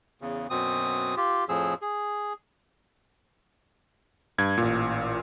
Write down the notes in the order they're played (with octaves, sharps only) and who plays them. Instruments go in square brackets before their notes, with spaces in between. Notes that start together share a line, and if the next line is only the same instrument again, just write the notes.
[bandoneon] E2 C#3
F#2 B2 C4 D#6
F4 G4
F2 A2 F3 G#4 E6
G#4
[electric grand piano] G2 G#6
A1 A#2